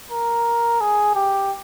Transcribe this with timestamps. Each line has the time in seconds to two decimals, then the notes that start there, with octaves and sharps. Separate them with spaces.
0.11 A#4
0.81 G#4
1.15 G4